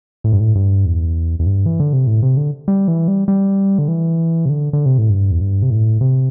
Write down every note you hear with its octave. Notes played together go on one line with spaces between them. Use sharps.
A2
G2
A2
G2
E2
E2
G2
E3
D3
C3
A2
C3
D3
G3
E3
G3
G3
D3
E3
C3
D3
D3
C3
A2
G2
E2
G2
C3
A2
C3